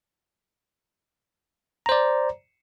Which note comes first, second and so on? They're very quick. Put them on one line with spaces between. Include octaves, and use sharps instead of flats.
A#5 C5 D5